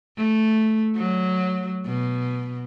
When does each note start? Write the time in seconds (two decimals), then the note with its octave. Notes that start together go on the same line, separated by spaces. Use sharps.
0.18 A3
0.96 F#3
1.86 B2